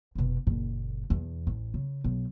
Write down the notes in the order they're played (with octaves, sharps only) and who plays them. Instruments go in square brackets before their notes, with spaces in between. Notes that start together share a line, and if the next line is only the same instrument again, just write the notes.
[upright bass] F1 B2
F#1 A#2
E2 B2
A1
C#3
B1